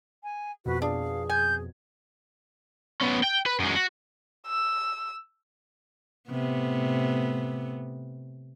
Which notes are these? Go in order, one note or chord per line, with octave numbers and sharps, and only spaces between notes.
G#5
F2 B2 F#4 B4
D4 G#4 F5
G#5 G6
B3 C#4
G5
B4
F#2 G#3
F#4
E6
A2 C3 B3